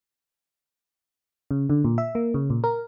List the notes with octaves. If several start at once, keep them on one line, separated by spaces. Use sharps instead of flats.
C#3
D3
A#2
E5
A#3
C#3
A#2
A#4